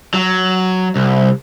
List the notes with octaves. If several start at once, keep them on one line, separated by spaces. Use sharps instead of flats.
F#3
C2